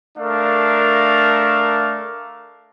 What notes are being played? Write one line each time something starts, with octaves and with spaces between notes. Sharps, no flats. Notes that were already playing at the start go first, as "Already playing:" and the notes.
A3 D4 A#4 F5